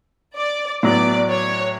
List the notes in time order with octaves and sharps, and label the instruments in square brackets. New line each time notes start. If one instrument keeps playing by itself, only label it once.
[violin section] D5
[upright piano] A2 F#3 B3 [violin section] D5
[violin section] C#5